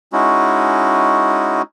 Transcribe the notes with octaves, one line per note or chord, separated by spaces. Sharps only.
G#3 C#4 D#4 E4 F#4